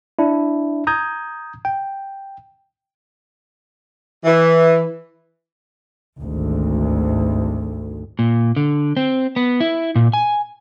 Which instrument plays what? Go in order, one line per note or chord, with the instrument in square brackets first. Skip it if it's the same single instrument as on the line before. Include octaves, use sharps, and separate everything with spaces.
[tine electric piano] D4 E4
A#5 D#6 G6 G#6
G5
[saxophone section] E3
[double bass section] G#1 D2
[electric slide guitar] A#2
D3
C4
B3
E4
A#2
G#5